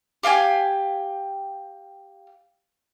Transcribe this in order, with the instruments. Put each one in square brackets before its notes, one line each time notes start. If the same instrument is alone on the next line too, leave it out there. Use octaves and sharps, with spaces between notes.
[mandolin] G4 F5 G5 G#5